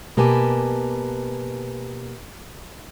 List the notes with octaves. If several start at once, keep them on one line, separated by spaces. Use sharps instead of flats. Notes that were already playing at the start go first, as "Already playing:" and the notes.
B2 A#3 G4 B4 G#5 A5